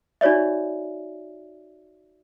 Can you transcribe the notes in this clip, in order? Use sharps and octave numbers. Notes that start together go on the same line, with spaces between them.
D#4 F#4 C#5 D5 E5